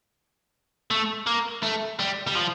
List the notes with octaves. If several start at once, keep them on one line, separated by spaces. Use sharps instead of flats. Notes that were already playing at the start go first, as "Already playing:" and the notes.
A3
A#3
A3
G3
G3
F3